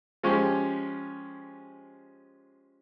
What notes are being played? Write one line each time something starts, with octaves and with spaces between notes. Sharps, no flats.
F3 G#3 C#4 G4